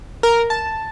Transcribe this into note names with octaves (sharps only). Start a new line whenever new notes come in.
A#4
A5